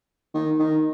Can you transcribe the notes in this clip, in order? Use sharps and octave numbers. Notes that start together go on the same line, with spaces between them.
D#3
D#3